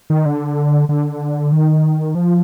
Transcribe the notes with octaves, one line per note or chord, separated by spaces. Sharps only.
D#3
D3
D3
D#3
F3